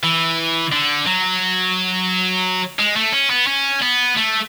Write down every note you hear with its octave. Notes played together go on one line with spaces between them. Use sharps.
E3
D3
F#3
G#3
A3
C#4
B3
C#4
B3
A3